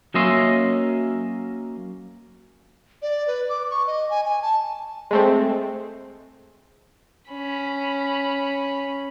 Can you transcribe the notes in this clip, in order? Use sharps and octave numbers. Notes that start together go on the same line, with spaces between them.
F#3 A#3 C#4 D#5 E5 C6
D5
B4
D6
C#6
D#5
G#5
G#5
A5
G#3 A3 C4
C#4 B5